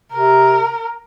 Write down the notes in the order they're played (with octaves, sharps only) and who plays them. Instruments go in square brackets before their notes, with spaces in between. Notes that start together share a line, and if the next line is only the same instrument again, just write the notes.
[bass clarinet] C3 [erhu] A#4